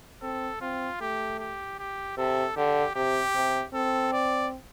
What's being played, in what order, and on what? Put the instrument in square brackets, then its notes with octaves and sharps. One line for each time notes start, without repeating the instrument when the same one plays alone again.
[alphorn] C4 [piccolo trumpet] A4
[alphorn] C4 [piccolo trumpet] F4
[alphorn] A3 [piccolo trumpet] G4
[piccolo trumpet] G4
G4
[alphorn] C3 [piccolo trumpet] A4
[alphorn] D3 [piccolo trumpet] G4
[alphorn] C3 [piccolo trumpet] G4
[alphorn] C3
[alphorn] C4 [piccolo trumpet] A4
[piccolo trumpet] D5